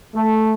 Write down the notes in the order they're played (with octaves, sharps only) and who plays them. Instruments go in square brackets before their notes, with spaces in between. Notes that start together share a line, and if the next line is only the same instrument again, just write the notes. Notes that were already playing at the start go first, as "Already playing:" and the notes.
[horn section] A3